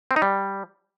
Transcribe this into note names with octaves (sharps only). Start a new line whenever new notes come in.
C4
D#4
G3